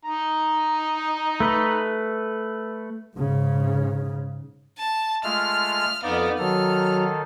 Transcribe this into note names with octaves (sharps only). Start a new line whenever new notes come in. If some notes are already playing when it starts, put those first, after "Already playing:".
D#4 A#5
A3 B4
G#2 C#3
A5
G#3 A3 F4 F6
F2 B3 D#4 D5 F5
D#3 F#3 A4 F6